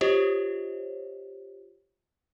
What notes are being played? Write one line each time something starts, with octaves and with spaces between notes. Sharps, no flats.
F4 G4 C5 C#5 D#5